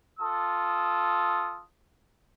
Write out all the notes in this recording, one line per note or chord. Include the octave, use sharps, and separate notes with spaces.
F4 A4 D#6